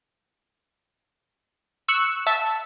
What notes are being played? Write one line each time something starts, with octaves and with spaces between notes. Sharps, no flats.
C#6 E6 F#6 C#7
E5 A5 E6